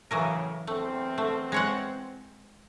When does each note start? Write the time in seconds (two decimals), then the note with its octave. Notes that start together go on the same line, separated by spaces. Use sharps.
0.11 A2 C#3 E3 F#3 A#4
0.67 E2 A3 C4
1.18 A3
1.52 G#3 C#5 F#5